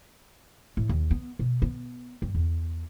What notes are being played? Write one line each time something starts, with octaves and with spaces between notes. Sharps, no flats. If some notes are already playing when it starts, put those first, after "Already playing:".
A2
D#2
B3
B2
B3
G2
E2